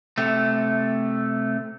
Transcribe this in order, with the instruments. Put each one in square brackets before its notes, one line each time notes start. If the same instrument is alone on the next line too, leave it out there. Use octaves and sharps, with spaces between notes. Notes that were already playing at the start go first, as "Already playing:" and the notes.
[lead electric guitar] C3 A3